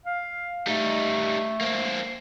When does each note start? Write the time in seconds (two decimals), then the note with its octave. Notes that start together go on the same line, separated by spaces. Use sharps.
0.06 F5
0.67 G3 A3 D#4
1.61 A#3 C4